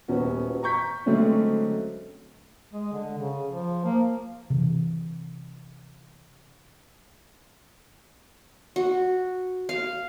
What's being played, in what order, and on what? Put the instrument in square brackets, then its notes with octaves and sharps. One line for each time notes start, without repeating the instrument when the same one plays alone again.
[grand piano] D#1 B3 C#4 F#4
A#5 C#6 G6 B6
D3 F#3 G#3 A3 C4 C#4
[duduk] G#3
D3
C#3
F3
A#3
[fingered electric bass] C3 E3
[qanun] F#4
F5